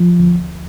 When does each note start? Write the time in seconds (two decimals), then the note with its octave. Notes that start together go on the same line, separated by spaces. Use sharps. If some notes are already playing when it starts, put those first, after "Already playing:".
Already playing: F3
0.19 D2